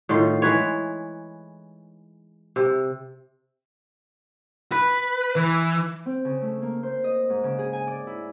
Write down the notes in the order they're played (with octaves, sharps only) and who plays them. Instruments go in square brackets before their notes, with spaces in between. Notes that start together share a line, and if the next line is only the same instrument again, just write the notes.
[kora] A2 D#3 F4
E3 G#3 B4 C#5
C3
[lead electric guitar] B4
E3
[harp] C4
C#3
A3
A#3
C5
D#5
G#2
C#3
G#4
G#5
D5
E4